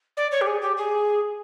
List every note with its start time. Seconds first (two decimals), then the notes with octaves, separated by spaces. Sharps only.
0.17 D5
0.32 C#5
0.41 G4
0.47 G#4
0.62 G4
0.77 G#4